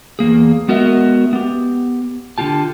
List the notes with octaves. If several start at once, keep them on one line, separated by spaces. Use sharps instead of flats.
E2 A#3 G#4
G#3 B3 F#4 A#4 D#5 E5
B3 G4
D3 D4 F4 G4 A5